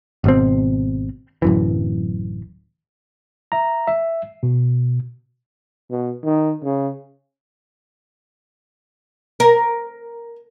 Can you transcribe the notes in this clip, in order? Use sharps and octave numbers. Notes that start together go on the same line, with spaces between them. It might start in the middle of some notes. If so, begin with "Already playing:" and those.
G#1 B2 C4
D1 F#2 E3
E5 A#5
E5
B2
B2
D#3
C#3
A#4